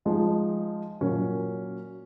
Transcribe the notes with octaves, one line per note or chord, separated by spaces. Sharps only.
F3 G#3 D#4
A#2 F#3 A#3 C#4